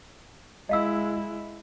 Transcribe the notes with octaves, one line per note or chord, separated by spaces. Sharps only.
G#3 E4 D#5 F5 E6